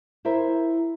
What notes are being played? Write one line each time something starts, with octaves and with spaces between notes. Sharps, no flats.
E4 A#4 C5 E5